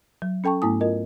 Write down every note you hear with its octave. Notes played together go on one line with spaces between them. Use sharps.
F#3
C#4 A4 G5 A5 C#6
G#2 A3 B3 E4 G#5 D#6
F4 A#4 D#5